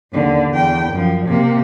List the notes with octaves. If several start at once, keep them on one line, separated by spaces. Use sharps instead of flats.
D#2 D3
E2 G5
F#2 F3
C3 A#3